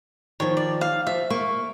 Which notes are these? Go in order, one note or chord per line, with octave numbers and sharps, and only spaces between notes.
D#3 F3 C#5
D5
F5
F3 E5
A#3 C#6